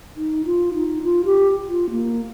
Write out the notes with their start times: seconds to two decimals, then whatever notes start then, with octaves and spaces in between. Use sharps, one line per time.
0.16 D#4
0.45 F4
0.74 D#4
1.03 F4
1.25 G4
1.68 F4
1.90 A#3